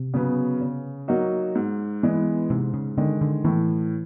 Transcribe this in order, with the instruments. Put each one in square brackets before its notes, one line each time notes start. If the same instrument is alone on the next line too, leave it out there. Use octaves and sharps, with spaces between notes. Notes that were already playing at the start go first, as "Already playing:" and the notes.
Already playing: [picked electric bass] C3
[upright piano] C#3 F#3 B3
C#3
F#3 A#3 D#4 F#4
G#2
E3 G#3 B3
[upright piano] G#2 [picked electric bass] C3
[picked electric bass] C#3
[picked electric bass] D3 [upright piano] D#3 G#3
[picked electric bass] D3
[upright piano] A2 [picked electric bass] E3